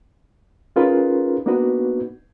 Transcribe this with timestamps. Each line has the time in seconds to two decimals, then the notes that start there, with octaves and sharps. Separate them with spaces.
0.76 C#4 D#4 F4 G#4 A#4 B4
1.46 A#3 B3 D4 D#4 F#4 B4